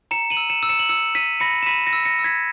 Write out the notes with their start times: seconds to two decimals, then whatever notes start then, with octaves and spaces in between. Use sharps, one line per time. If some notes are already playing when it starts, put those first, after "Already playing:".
0.11 A#5 C#7 E7
0.30 D#7 F#7
0.37 E6
0.50 C#7 E7
0.63 E6
0.69 C#7 E7
0.79 F#7
0.89 E6 C#7 E7
1.15 E6 B6 D#7
1.40 B5 A#6 C#7
1.63 E7
1.66 B5 B6 D#7
1.86 A#6 C#7
1.93 E6
2.05 A#6 C#7
2.19 E6
2.24 G#6 B6